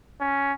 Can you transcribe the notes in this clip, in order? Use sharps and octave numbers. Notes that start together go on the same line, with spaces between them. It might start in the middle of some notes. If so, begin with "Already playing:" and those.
C#4